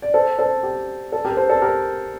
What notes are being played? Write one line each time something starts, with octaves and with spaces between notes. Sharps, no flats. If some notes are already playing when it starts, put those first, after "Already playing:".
D5
A4 C5
A4 C5
G4
A4
G4 A#4
A4 C5
A4
G4 A#4